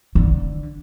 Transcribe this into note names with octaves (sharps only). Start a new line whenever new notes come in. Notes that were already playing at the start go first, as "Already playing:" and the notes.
D3